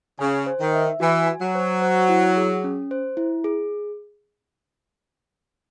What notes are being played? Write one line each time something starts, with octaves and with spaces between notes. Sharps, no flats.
C#3 G#5
C5
D#3
E5
E3 F#4
G#5
F#3
C5
C5
E4
G#4
C#4
C5
E4
G#4